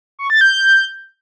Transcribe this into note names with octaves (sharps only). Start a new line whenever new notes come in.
C#6
A6
G6